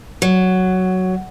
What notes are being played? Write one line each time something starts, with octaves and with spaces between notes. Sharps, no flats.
F#3